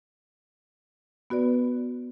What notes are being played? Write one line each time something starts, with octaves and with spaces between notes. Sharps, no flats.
B3 F#4 B4 D5